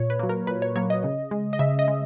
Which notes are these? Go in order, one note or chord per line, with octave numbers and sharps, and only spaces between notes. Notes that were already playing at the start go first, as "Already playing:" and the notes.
Already playing: A#2 C#5
B4
F#3 A#3
A#4
A#2 B4
C#5
F#3 A#3 C#5
D#5
C#3
G#3
D#5
C#3 E5
D#5
G#3